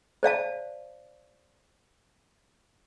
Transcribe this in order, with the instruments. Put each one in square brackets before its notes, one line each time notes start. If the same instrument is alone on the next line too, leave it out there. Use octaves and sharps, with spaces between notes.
[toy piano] C5 D5 F5 A5